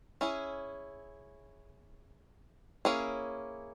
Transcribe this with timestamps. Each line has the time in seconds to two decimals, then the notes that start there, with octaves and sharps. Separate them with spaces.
0.21 C#4 E4 G#4
2.85 A#3 C#4 E4 G#4